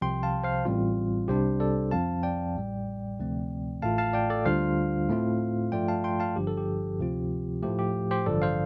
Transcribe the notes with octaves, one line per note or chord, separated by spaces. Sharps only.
C2 C3 F3 G5 C6
F5 A5
C5 F5
A1 A2 G3 C4 F4
C2 C3 G3 D4 G4 C5
A4 D5
F2 F3 C4 F5 A5
D5 G5
A1 A2 G3
D2 C3 F3 A3 C4
A1 A2 A3 F4 F5 A5
F5 A5
D5 G5
A4 D5
D2 D3 G3 D4 F4 C5 F5
A2 A3 C4 F4
G2 F3 A3 F4 D5 G5
F5 A5
G5 C6
F5 A5
G1 G2 D3 F3 G4
A4
G4
D2 C3 F3 C4 F4
A2 F3 A3 G4
G4
G4 C5
A1 G2 D3 F3 A4 D5
C5 F5